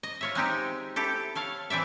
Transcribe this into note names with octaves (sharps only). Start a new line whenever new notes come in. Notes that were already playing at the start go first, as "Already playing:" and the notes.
D#5
F4 C#5 E5
G#3 C4 D#4 G4
E4 G4 A4
A4 C#5 F5
E3 C4 D5 E5